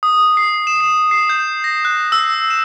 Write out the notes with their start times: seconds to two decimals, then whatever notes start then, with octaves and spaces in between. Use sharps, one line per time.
0.03 D#6
0.37 C7
0.67 E7
0.81 C7
1.11 C7
1.29 G6
1.64 A#6
1.85 F#6
2.12 E6
2.50 E7